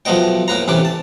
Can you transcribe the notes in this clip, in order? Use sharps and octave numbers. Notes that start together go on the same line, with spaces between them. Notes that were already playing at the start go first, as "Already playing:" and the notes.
B1 F3 A3 B3 D#5 G5
A2 A#3 B4 A#5
A1 A2 C3 B4 D6
A5